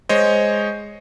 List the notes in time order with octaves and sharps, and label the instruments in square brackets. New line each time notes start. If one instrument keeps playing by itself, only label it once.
[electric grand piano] G#3 C5 C#5 D#5